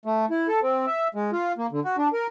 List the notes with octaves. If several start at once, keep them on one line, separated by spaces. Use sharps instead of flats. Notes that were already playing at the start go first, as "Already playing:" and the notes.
A3
E4
A4
C4
E5
G#3
F4
A#3
D3
F#4
D4
A#4